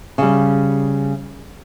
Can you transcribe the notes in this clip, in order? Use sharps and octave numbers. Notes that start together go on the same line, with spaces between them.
C#3 G3